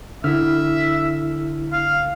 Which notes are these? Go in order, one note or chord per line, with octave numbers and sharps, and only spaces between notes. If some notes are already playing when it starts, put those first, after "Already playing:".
D3 E4 E5 F6
F5